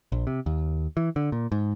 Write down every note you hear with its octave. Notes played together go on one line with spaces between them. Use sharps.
A#1
C3
D#2
E3
D3
A#2
G#2